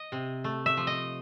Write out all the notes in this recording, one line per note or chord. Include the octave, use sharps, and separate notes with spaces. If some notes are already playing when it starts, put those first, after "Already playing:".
Already playing: D#5
C3
A3
E5
F3
D#5